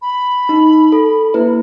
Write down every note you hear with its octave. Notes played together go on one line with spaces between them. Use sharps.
B5
D#4
A4
A#3 E4 B4